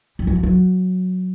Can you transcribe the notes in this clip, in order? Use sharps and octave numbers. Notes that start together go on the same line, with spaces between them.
G3
F#3
F3
F#3